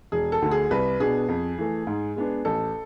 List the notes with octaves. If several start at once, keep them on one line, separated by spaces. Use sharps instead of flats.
E1 G#4
A4
D2 D3
G#4
C2 B4
B2 B3 D4 G#4
F2
E3 A3
G#2
G#3 B3 D4
A1 A4